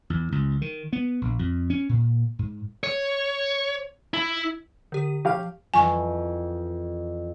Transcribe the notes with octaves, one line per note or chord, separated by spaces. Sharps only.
E2
C#2
D#3
B3
A#1
F2
C#4
A#2
G#2
C#5
E4
D3 G4 D#7
F3 G4 F5 F6 G6
F2 E3 B4 G#5 C#6